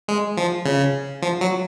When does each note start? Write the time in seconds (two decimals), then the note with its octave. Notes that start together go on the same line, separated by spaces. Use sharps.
0.08 G#3
0.37 F3
0.65 C#3
1.22 F3
1.41 F#3